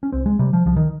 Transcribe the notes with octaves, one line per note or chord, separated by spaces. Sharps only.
C#4
C2 C4
G#3
C3 G3
F3
C2 F3
D#3